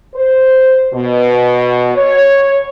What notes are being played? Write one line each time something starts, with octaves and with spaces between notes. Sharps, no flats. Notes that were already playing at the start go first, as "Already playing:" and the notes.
C5
B2
C#5